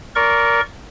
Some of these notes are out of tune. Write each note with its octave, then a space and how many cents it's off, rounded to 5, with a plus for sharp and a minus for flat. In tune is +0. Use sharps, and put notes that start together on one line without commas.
A#4 +0 D5 -25 C#6 -15